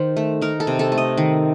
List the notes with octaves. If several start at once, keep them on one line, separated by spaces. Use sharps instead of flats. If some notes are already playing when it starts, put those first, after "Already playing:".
Already playing: D#3 C5
A3
D#4 A#4
A4
C3
A4
A3
D#5
D#3